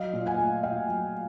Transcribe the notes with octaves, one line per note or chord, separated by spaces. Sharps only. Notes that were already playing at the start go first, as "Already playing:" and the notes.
Already playing: F#3 D#5 F5
A#2
F#5 G#5
A3
A#2 F5 G5
F#3